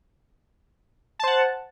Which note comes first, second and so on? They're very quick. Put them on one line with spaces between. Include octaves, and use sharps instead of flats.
A5 C5 F#5